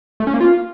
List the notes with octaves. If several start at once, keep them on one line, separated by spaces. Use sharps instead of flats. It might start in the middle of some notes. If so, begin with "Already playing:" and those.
A3
C#4
A#3
F4